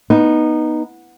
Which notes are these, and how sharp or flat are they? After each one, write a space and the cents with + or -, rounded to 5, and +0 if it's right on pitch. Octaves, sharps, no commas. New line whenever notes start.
B3 -15 D#4 -5